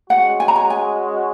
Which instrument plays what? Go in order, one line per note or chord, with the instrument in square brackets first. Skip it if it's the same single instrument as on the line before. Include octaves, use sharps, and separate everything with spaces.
[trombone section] G#3 C#4 F#4 [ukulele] F#5
[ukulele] G#5
A#5
G#5
G#5